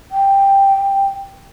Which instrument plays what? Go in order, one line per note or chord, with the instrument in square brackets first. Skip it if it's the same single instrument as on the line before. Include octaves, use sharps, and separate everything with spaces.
[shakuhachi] G5